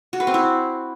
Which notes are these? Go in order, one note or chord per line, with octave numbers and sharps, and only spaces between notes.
F#4
B4
C4
E4